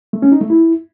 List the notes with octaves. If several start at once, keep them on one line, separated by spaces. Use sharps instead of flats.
A3
C#4
D#4
A3
E4